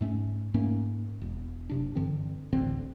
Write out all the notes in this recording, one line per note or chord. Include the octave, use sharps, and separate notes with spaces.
G#2 A3 C#4
G#2 A3 A#3 C#4
E1
F#1 C3 D4
G2 D3 E3 C4
D1 A1 D3 C4